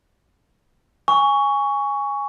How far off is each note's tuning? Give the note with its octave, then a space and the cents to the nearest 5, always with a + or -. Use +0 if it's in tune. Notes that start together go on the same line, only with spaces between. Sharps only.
G#5 -10 C#6 +15